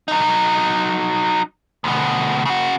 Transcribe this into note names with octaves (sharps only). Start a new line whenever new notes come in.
F#3 D#4
D2 B2
C#3 F#4